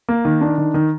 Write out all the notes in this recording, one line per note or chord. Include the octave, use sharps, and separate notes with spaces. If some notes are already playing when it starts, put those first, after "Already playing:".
A#3
D#3
D4
D#3
D#3